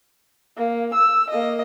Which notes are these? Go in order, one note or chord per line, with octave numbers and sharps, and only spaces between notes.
A#3
E6
A#3 D#5